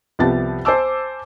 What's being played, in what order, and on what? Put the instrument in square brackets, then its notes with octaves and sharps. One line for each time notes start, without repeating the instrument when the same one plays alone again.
[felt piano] C2 F3 B3 G4 A5 A6
C5 G#5 A5 D6 E6